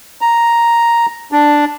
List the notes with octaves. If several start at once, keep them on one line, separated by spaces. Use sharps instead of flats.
A#5
D4